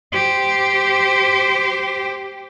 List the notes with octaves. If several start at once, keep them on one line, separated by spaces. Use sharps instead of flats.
G4 C5